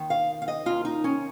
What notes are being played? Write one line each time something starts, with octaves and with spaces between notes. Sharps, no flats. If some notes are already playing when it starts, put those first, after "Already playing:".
Already playing: D#2 D#3
F5
F5
D#5
D#2 C#3 F4
D#4
C#4